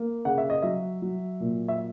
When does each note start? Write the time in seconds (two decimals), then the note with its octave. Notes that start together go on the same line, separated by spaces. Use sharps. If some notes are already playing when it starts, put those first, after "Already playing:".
Already playing: A#3
0.25 C#3 F#5
0.38 E5
0.50 D#5
0.62 F#3 E5
1.02 F#3
1.40 A#2
1.68 E5